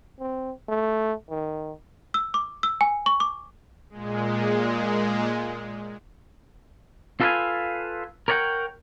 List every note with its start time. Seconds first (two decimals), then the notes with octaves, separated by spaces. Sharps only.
0.19 C4
0.68 A3
1.29 D#3
2.14 E6
2.34 D6
2.63 E6
2.81 G#5
3.06 C#6
3.20 D6
3.90 A#2 G#3
7.21 F4 A4 B4 D5 F5 G#5
8.28 A#4 C#5 D5 F#5 G5